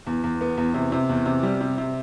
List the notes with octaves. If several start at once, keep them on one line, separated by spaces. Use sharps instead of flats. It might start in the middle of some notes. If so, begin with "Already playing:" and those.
E2
E2
B3
E2
C3
C3
E2
C3
G3
C3
C3